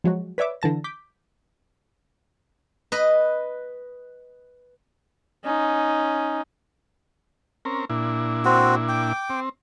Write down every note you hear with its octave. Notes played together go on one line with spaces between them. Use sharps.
F3 F#3 G#3 F#4
B4 C#5 D5 E5 D6
D3 E3 A5 A#6
D6 G6 B6
B4 D#5 B5
C#4 D#4
C4 C#4 A#4
A#2 D4 E4
C4 F#4
G5 D6
C4